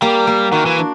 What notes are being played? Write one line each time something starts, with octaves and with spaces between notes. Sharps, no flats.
G3 A#3
A#3
D#3 F#4
E3
D4